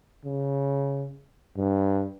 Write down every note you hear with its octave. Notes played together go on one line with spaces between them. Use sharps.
C#3
G2